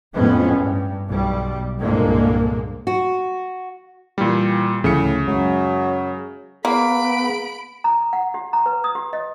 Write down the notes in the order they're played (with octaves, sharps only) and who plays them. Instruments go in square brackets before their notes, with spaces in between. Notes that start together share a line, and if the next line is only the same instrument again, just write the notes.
[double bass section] F2 A2 G#3 B3 C#4
G2
B1 G3
C2 G2 A#2 D3 G#3 A#3
[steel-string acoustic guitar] F#4
[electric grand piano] A#2 G3 [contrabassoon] E3
[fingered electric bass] D2 F3 A3 [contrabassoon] A2 [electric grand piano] C#3 C#7
[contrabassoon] F#2 [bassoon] F#3 [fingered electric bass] G#3
[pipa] A#3 [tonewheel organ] B3 [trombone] G#4 [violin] B5 D7
[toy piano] A#5
F#5
G4
A#5
B4
D#6
G4
D#5